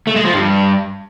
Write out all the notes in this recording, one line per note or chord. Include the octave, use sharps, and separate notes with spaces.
A3
G#3
F3
G2